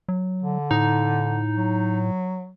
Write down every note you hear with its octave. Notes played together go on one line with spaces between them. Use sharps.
F#3
D3
A2 D#4
F#3